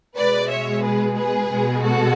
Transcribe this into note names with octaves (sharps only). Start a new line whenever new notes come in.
B2 G#3 B4 D5
C#5 E5
G#4 B4
G#4 B4
B2 G#3
F#4 A4